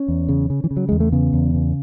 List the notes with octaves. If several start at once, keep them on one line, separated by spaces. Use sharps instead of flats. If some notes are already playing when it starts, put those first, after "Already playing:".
Already playing: C#4
E2
C#3
C#3
E3
C#3
F#3
E2 G#3
A3
C#3 B3
E2
C#3